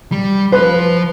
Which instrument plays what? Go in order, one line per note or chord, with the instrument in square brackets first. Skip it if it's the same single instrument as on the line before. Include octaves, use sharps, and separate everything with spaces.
[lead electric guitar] G3
[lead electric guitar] F3 C5 [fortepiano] B4